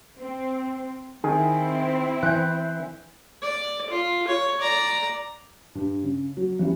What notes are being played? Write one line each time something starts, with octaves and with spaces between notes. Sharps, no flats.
C4
D#3 C4 E4 G#4
E3 F#6 G6
D5
F4
C#5
D5 A#5
G2
C#3
F#3
E3 G3 C#4